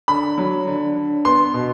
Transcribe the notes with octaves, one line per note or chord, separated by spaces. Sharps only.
D3 B5
F#3
D3
D3
B3 C6
B2